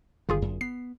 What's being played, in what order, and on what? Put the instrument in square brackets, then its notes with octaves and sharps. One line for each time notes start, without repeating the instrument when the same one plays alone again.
[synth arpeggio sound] G1 F4 G#4 [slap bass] D#3 G3
[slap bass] F#2
[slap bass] B3 [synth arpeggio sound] C7